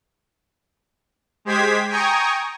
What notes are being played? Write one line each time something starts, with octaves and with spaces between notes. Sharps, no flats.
G#3 G4 C5 G#6 B6
G5 G#5 A#5 C#6 D#6